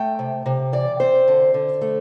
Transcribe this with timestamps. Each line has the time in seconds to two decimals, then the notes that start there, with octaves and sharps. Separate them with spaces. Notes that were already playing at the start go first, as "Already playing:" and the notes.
Already playing: A3 G5
0.19 C3
0.46 C3
0.73 E3 D5
1.00 C4 C5
1.28 D3
1.54 D3
1.81 A3